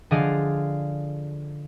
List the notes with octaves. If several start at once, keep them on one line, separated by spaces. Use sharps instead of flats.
D3 F3 G#4 D5 D#5 F5